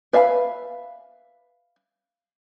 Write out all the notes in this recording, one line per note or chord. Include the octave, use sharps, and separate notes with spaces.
B4 E5 F5 G#5 B5